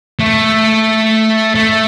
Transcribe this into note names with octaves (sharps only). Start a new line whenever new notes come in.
A3
A3